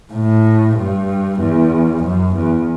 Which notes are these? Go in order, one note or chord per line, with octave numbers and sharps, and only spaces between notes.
A2
G2
E2
F#2
E2